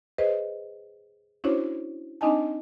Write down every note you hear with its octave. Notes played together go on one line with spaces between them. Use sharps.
G#4 B4 C5 D#5
C#4 D4 E4 F#4 C5 C#5
C4 D4 D#4 D#5 G#5 A5